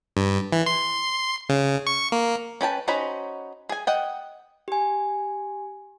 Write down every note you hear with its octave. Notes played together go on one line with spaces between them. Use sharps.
G2
E3
C6
C#3
C#6
A#3
C#4 B4 G5 A5
C#4 D#4 F#4 C5 B5
G#4 G#5
D#5 F#5 G5
G4 G#5